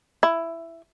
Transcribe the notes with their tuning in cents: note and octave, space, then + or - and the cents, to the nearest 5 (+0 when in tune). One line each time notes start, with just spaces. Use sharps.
E4 +10